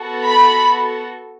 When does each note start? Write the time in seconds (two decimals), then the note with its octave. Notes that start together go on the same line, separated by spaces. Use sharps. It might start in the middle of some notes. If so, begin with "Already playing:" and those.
Already playing: B3 F#4 A4
0.22 B5